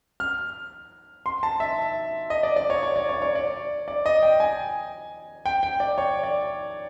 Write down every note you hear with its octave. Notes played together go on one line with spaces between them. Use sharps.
F6
C6
A5
E5
D#5
D5
D5
C#5
C#5
D5
C#5
C#5
D5
D5
D#5
G5
G#5
G5
G5
D5
C#5
D5